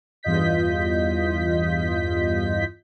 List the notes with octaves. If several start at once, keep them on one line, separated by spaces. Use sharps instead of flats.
E2 G2 F4 D#5 G6 B6